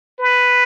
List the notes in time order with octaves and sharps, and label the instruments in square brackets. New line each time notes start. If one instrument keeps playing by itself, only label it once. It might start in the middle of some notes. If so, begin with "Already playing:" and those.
[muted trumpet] B4